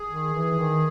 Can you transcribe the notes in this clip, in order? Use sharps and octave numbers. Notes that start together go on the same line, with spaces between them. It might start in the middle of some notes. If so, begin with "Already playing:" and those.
Already playing: G#4
D#3
E3
D#3